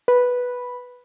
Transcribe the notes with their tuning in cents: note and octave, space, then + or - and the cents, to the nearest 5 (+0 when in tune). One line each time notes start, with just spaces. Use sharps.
B4 -5